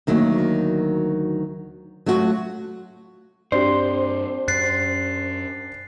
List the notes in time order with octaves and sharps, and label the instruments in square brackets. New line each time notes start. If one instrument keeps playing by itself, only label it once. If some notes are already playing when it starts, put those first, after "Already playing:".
[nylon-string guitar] D2 D#3 F#3 A#3
F#3 A3 F4 F#4
[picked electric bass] G2 C4 [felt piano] D4 G4 [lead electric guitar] C5
[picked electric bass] F#2 [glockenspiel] F#6 A6 C7